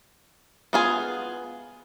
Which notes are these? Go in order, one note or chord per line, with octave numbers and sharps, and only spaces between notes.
B3 F4 G#4